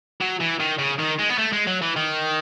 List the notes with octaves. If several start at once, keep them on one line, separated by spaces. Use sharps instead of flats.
F#3
E3
D#3
C#3
D#3
G#3
B3
A3
G#3
F#3
E3
D#3